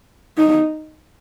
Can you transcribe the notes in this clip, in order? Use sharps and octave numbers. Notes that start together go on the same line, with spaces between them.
D#4